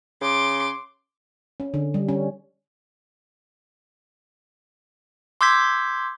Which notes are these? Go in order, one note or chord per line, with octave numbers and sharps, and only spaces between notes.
C#3 C6 D6
C#4
D3
G3
C#4
C6 D6 E6 G6 G#6 B6